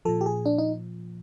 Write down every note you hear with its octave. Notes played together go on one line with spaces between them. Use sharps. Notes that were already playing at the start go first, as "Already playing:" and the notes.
A#2 F3 A4
G4
G#4
D4
D#4